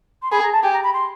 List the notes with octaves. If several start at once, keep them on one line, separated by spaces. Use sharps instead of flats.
C6
G#4 B5
A#5
A5
G4 G#5
A#5
B5
C6